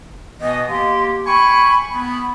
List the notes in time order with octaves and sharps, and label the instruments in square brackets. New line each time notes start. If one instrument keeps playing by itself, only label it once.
[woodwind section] B2 E3 B3 [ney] D#5
[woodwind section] A#3 G4 [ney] C6
[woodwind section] G5 G#5 C#6 [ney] B5
[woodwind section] B3 [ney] B5